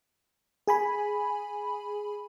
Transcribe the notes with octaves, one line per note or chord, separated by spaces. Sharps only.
G#4 G#5 B5